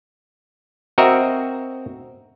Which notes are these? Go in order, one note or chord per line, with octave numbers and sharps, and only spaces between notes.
C4 F#4 A#4 D#5 E5 A#5